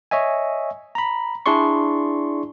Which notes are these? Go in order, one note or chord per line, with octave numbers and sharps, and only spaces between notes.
C#5 D#5 E5 G#5
A#5 B5
D4 E4 G#4 D5 C6 C#6